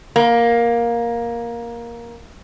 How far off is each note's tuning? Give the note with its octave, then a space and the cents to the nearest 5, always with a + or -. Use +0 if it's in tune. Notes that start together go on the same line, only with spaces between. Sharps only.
A#3 +10